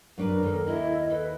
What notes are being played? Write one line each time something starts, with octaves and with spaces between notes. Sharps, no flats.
F#2 D4 A#4 B4
D#2 A4
E4 D#5
A4 B4